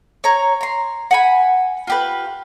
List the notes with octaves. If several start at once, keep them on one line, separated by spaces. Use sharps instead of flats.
C#5 A#5
A#5 C6
F#5 G#5 B5
F4 G4 B4